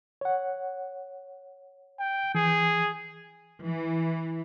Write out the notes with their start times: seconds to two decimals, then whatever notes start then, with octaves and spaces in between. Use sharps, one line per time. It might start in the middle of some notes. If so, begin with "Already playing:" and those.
0.21 C#5 F#5
1.99 G5
2.35 E3 G#4
3.64 E3